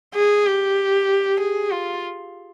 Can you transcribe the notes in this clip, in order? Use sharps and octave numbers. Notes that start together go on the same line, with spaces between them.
G#4
G4
G#4
F4